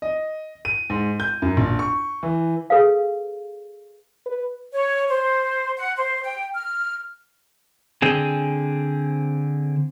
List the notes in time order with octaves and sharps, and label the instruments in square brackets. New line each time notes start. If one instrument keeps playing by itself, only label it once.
[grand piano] D#5
D#7
G#2
G6
F#2
A#1
C#6
E3
[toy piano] G#4 A4 B4 F5
[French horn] B4
[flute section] C#5
C5
F#5
C5
G5
F6
[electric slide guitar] D3 C4 G#4